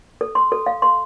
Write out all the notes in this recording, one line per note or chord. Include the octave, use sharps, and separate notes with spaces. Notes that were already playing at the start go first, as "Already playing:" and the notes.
A4
C6
A4
F5
C6